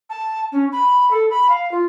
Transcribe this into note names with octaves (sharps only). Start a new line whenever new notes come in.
A5
C#4
B5
A4
B5
F5
F4